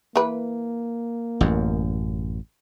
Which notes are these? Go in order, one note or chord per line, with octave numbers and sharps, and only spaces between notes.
E3 A#3 B4
A1 F#2